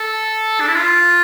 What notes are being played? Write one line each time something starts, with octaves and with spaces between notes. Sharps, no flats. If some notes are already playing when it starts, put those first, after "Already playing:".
Already playing: A4
D4
E4
F4